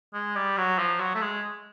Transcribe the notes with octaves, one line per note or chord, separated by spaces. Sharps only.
G#3
G3
F#3
F3
F#3
A3
G#3